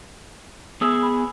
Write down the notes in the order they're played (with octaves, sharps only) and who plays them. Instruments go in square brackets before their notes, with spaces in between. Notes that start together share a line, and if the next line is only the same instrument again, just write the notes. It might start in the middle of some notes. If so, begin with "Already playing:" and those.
[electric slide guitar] B3 G#4 [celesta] D#6 E6
[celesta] G#5 B5